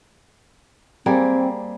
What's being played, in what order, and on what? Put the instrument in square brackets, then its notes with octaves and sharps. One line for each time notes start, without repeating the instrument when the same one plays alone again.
[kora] G3 A#3 G#4 [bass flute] C4